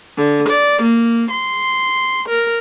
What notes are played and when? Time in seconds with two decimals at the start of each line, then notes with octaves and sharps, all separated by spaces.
0.18 D3
0.49 D5
0.82 A#3
1.31 C6
2.28 A#4